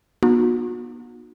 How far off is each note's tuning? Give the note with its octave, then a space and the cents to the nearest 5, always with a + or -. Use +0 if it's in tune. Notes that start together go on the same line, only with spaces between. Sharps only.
B3 -35 D#4 -35 F#4 -45